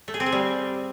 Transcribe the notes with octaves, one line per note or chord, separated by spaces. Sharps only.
A3
G#4
C4
G#4
G3